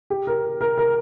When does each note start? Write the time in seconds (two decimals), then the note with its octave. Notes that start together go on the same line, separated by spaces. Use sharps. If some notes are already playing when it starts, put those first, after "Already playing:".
0.10 G4
0.27 A#4
0.61 A#4
0.78 A#4